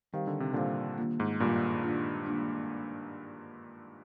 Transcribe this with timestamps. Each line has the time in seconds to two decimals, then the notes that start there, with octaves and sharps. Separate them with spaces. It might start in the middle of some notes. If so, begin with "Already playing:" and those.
0.13 D#3 G3 C4 G4 C5 F5
0.27 D3
0.40 C3
0.53 A#2 D3 G3 C4 G4 C5 F5
0.98 D#3 A#3 D4 F4
1.20 G#2
1.40 G2 A#2 D#3 A#3 D4 F4
1.83 D#3 A#3 D4 F4
2.26 D#3 A#3 D4 F4